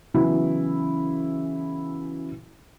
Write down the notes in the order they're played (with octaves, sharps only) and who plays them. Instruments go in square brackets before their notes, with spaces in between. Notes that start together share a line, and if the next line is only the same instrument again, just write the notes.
[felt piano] C#3 E3 F#3 B3 E4 F#4